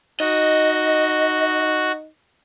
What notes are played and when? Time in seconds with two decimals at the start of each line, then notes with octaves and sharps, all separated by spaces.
0.20 D#4 F#4 D#5